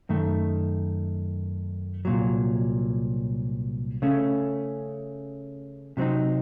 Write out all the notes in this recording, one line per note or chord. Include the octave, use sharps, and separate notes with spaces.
F#2 D#3 A3
C2 A#2 F#3
C#3 A3 C#4
C3 F#3 C4 D#4